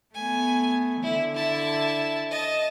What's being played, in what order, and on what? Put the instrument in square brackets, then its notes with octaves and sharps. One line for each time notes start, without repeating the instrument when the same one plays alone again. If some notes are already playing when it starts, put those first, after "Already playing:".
[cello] A3 B3 [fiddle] G#5
[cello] D3 [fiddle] E4
[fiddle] E4 A5
D#5 A5